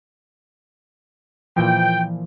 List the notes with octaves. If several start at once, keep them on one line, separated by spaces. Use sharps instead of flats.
A#2 E3 F3 G5